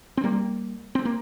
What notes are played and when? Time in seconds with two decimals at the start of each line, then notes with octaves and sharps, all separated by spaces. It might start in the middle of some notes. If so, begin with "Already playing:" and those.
0.17 C4
0.24 G3 A#3
0.95 C4
1.05 A#3